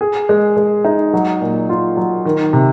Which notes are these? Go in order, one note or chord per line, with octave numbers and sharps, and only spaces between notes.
G#4
G#3
G#3
D#4
F#3
A#2
F4
F#3
D#3
C3